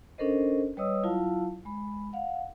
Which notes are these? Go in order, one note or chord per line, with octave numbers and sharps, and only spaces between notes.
C#4 D4 A4 A#4 C5 D#5
G3 B4 C#5 D#5 D#6 E6
F#3 E4 F4 F5 A5
G#3 B5
F5 F#5